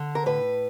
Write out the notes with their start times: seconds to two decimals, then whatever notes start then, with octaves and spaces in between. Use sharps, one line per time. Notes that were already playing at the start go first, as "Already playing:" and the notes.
Already playing: D3
0.15 A#4
0.26 A2 B4